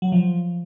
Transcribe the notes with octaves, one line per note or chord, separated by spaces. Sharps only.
F#3
F3